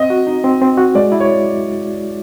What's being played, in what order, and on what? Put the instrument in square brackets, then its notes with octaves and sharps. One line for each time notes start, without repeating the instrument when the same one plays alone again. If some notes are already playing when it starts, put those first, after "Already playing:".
Already playing: [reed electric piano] C4 [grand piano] D#5
[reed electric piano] F#4
D#4
C4
C4
F#4
[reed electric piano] G#3 [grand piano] D5
[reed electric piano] E4
[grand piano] C#5